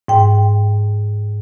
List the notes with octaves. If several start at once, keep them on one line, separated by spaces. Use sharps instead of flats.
G#2 G5